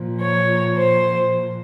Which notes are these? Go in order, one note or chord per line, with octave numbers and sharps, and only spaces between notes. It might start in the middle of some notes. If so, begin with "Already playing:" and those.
Already playing: A#2 F3
C#5
C5